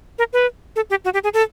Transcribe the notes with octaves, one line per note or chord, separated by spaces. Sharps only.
A#4
B4
A4
G4
F#4
G4
G#4
A4